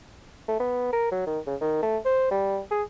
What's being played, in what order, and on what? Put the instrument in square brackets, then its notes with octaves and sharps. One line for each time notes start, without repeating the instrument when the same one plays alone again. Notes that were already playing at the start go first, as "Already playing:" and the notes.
[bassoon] A3
B3
A#4
F#3
D#3
C#3
D#3
A3
C5
G3
G#4